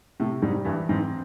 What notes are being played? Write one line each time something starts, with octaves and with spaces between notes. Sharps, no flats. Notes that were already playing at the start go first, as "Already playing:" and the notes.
A2 C3
G#2 G3
G2 E3
G#2 C4